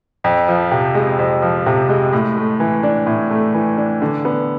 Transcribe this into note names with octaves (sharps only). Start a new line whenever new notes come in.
F2
F3
C3
G#3
F2
F3
C3
G#3
A2
A3
E3
D4
A2
A3
E3
D4
D3
B3